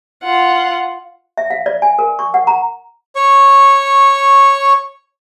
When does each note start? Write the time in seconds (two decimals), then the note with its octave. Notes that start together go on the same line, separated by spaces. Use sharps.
0.23 F4 F#5
1.37 E5
1.50 F5
1.66 D5
1.82 G#5
1.99 A#4
2.19 C#6
2.34 F#5
2.47 A#5
3.16 C#5 C#6